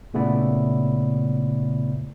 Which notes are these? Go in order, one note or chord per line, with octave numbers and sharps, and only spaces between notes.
A#2 C#3 A3 B3 E4 D5